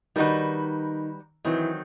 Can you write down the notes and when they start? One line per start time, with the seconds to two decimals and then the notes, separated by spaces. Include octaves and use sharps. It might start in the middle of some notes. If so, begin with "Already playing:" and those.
0.16 D#3 G3 D#4 F#4 B4
1.45 D#3 E3 F#3 C4